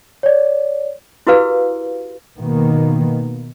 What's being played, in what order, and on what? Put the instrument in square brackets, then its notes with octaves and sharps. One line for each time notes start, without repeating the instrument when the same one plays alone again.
[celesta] C#5 D5
[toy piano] E4 F#4 G4 A#4 B4 F5
[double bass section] B2 D#3 A#3 B3